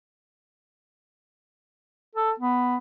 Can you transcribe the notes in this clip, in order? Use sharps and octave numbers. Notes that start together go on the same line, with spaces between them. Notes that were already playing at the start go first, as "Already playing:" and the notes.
A4
B3